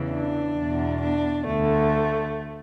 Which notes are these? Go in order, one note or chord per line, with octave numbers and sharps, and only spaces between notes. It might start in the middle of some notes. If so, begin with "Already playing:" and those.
Already playing: E2 C#3 E3
D4
E2 B2
D4
D2 D3 A3